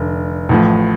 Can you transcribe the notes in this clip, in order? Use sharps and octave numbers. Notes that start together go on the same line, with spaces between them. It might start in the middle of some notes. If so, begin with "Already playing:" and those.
Already playing: F1 D3
A1 A2 F3